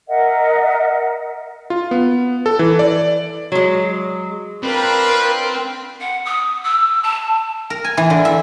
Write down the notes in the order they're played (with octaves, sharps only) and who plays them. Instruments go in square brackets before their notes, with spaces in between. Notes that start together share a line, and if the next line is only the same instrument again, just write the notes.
[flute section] A#4 D#5 E5 F#5
[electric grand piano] F4
B3
A4
E3
D5
[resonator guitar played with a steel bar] F#3 G#3
[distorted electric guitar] C4 [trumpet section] D4 F4 B4 [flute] A#4
[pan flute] F#5
D#6
E6
A5
[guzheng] A#4
G#5
E3
D3
E5